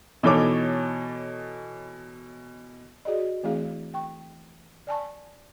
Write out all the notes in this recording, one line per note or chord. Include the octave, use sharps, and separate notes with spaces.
B2 E3 D#4 A4 C#5 D6
F#4 G#4 D5 D#5
E3 A3 C4 E4 G#4 F5
G5 C#6
D5 G#5 A5 C#6